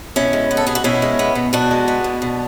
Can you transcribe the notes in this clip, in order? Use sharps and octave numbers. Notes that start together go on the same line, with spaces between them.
B2 C#4 E4
G#3
B3
A4
B2 G#4
F#4
B2 C#4 E4
G#3
B3
B2
B2 D4 F#4
G#3
B3
B2
B2